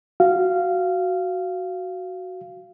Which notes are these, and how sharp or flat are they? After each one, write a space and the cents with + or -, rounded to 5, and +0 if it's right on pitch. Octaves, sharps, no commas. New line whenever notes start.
F#4 +0 F5 -15